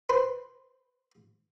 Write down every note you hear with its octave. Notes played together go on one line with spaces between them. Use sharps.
B4 C5